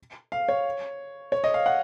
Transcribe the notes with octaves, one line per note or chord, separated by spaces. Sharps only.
F5
C#5
C#5
D#5
F5
F#5